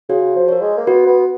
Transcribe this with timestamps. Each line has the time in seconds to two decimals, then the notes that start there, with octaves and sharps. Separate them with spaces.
0.09 C#3 F#4
0.35 F3
0.48 A#4 C#5
0.61 G#3
0.77 A#3
0.87 B3 F#4
1.07 B3